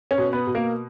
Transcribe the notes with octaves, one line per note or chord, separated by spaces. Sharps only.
C#4 C#5
B2
B3 B4
B2
A#3 A#4